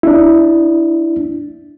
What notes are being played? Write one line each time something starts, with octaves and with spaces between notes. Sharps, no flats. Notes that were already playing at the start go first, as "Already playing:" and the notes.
D4 E4